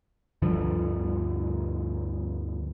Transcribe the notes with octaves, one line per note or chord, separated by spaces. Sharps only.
D2 G2 D3 F3